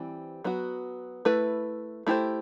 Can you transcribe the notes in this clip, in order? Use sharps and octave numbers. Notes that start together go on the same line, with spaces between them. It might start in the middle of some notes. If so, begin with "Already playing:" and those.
Already playing: E3 G3 C4
F#3 B3 F#4
A3 E4 B4
A3 E4 G4 C5